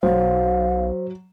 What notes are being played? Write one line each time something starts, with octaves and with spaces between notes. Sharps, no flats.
B1 F#3 C5 F5